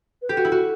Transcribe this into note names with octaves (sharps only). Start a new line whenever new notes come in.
B4
G4 A4
F#4
E4
F#4